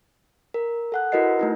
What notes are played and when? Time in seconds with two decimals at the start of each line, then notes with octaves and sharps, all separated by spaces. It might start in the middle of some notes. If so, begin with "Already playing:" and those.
0.54 A#4
0.92 A4 F#5 F#6
1.12 E4 F#4 A#4 B4 D#5 C7
1.39 A3 D#4 E4